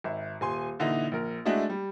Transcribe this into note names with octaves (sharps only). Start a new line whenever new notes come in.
G#1 E5
D#1 G#5 C6
A#2 D3 E3 D#4 E4
A#1 A#4
G#3 A3 D4 E4 F#4 D#5
G3